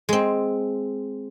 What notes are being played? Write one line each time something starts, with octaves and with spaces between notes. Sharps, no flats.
G#3 C4